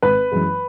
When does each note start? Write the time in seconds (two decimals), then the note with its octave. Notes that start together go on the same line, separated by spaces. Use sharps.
0.02 G#1 B4
0.32 F#2 E3 G#3